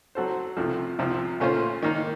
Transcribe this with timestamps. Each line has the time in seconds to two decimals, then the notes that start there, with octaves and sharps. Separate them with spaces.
0.15 F#3 C4 F#4 A4 C5
0.57 C2 C3 F3 A3
0.99 C2 C3 F3
1.40 A#2 A3 C#4 F4 C5
1.82 D#3 A#3 D#4